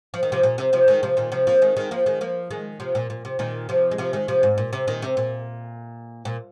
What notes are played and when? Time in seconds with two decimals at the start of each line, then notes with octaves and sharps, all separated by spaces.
0.14 F3
0.23 D#3
0.32 C3 F3
0.43 A#2
0.58 C3
0.73 C3 F3
0.88 D#3 G#3
1.03 C3 F3
1.17 A#2 D#3
1.32 C3 F3
1.47 F3 A#3
1.62 D#3 G#3
1.77 D#3 G#3
1.91 F3 A#3
2.06 D#3 G#3
2.21 F3 A#3
2.51 D#3 G#3
2.80 C3 F3
2.95 A#2
3.10 A#2
3.25 C3
3.39 A#2 D#3
3.69 C3 F3
3.91 G#3
3.98 C3 F3
4.13 D#3 G#3
4.28 C3 F3
4.43 G#2
4.58 A#2
4.73 C3
4.88 A#2 D#3
5.02 C3
5.17 A#2
6.25 A#2